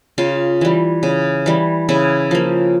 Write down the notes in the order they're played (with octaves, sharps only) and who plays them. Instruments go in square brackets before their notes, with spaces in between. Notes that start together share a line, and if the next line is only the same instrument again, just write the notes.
[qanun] C#3 F4
E3 G3
C#3
E3 G3
C#3 E4
F3 A#3